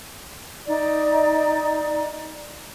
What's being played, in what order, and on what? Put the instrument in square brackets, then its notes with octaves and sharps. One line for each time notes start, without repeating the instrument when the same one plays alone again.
[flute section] D#4 D5